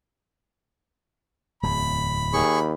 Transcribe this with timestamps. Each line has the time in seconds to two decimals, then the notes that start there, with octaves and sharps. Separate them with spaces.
1.63 D1 E2 B5
2.33 D#2 G#4 C#6